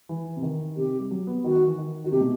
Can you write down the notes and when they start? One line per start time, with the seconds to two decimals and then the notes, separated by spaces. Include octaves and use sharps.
0.09 E3
0.37 C3
0.43 D#3
0.77 C3 G4
0.99 G3
1.11 F#3
1.27 B3
1.44 D#3 F#4
1.55 D#3
1.67 E3
1.78 D#3
2.04 D#3 F#4
2.11 C3 G4
2.21 B2